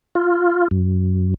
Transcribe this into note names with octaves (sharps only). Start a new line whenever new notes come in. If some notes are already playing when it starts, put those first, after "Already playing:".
F4
F#2